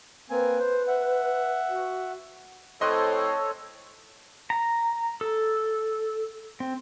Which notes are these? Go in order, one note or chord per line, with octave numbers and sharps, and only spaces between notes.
A#3 C4 B4 G#5
C5
E5 F#5
F#4
A2 C4 A4 C5 C#5 D#5 C6 F#6
A#5
A4
C4